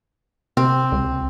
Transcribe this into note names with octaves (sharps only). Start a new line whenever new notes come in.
C3 C4
C#2